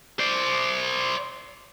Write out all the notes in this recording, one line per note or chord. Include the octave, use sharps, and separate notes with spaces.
C5 D5